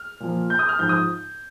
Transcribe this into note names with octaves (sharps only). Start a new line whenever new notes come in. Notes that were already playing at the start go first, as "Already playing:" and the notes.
Already playing: F6
A#2 F3
G6
D#6
F6
G#2 F3 G6
D#6